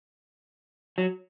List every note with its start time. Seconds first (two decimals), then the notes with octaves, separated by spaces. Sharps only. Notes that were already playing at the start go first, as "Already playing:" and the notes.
0.98 F#3